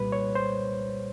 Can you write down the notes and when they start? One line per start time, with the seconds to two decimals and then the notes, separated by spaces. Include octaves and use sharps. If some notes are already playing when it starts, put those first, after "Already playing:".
Already playing: C2 A#2 G3 B4
0.12 C#5
0.35 C5